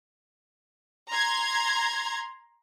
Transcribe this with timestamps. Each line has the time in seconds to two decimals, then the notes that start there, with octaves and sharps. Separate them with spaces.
1.11 A#5 C6 G#6